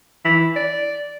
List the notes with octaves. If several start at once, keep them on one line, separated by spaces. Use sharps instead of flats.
E3
D5